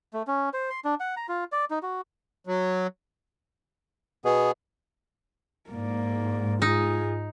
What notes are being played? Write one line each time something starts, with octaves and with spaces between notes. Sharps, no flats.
A3
C#4
C5
C6
D4
F#5
A#5
F4
D5
D#4
F#4
F#3
B2 B3 G#4
G#2 A#3 D5
D#4 F4 G#4